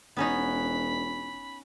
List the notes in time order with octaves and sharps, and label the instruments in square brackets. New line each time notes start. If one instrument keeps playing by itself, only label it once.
[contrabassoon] E1 [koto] B3 C#4 D#4 [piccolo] B5